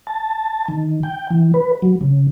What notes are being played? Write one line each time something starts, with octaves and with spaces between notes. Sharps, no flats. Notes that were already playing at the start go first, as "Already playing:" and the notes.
A5
D#3
G5
E3
B4
F#3
C#3